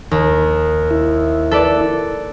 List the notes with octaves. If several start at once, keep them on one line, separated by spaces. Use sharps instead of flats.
D#2
E4
A4 B4 D5